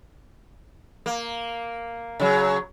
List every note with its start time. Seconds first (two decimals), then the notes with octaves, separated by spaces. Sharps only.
1.06 A#3
2.20 C#3 F#3